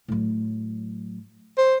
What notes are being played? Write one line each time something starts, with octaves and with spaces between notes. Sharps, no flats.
A2 F#3
C5